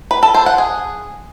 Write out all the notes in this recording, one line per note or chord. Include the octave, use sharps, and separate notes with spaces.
B4
A4
C5
F#5
G#4